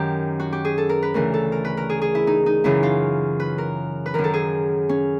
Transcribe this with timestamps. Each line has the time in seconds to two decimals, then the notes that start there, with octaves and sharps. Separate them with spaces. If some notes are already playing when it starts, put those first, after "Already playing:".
Already playing: F#2 D#3 G4 A#4
0.40 F#4
0.53 G4
0.65 G#4
0.78 A4
0.89 A#4
1.02 B4
1.14 D2 C#3 E3 A#4
1.34 A4
1.52 A#4
1.65 B4
1.77 A#4
1.89 G#4
2.02 G#4
2.15 E4
2.27 D#4
2.46 D#4
2.64 F#2 C#3 E3 E4
2.83 F4
3.40 B4
3.58 A#4
4.06 B4
4.14 F#2 D#3 A#4
4.24 A4
4.34 G#4
4.89 C#4